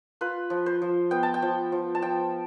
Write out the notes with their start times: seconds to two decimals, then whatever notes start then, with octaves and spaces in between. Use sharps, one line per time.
0.21 F4 B4
0.50 F3
0.66 C5
0.82 F3
1.11 B3 G5
1.23 A5
1.34 G5
1.42 F3
1.72 F3
1.95 A5
2.02 F3 G5